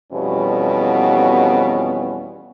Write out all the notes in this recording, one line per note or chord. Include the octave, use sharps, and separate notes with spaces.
F2 B2 E3 G3 B3 C#4